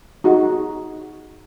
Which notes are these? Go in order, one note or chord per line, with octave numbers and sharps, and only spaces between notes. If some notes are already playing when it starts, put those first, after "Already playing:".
D#4 F#4 G#4